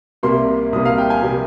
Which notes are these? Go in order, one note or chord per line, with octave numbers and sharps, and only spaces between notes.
C2 C3 G3 A#3 C6
C2 C3 G3 A#3 D#6
F5
G5
G#5
C3 G3 A#3